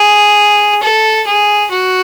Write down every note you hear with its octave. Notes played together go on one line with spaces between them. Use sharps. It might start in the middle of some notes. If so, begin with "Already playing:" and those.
Already playing: G#4
A4
G#4
F#4